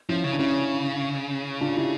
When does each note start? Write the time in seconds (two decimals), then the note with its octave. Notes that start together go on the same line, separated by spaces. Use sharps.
0.09 F3 C#4 E4
0.24 C#3
0.33 D4
0.39 C#3 C#4 E4
1.61 D4 F4
1.76 E4 G4